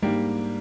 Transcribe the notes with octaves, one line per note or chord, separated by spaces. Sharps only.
G#2 G3 A#3 D4 G4